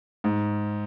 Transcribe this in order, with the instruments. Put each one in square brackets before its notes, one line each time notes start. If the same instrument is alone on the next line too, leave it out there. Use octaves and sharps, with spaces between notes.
[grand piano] G#2